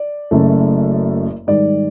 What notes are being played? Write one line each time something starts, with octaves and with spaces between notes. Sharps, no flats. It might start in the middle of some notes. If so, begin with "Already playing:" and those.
Already playing: D5
F#1 F#2 C#3 F#3 A3
G#2 D#3 G3 D5